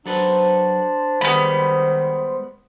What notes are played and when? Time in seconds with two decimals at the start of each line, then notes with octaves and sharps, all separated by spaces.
0.06 F#3 D4 A4 B4 C5
1.21 D#3 G3 G#3 B3 B5